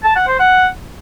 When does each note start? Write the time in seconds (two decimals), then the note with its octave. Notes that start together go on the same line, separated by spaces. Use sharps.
0.04 A5
0.16 F#5
0.28 C5
0.40 F#5